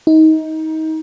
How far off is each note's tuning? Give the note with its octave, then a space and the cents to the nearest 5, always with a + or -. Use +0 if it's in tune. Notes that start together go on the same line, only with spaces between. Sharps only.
D#4 +25